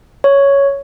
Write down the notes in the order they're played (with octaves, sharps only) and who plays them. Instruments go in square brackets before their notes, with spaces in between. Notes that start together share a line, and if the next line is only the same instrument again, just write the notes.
[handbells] C#5